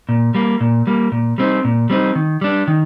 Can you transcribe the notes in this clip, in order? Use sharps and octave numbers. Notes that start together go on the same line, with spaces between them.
A#2
G3 A#3
A#2
G3 A#3
A#2
G3 C4 D#4
A#2
G3 C4 D#4
D#3
G3 D4
D#3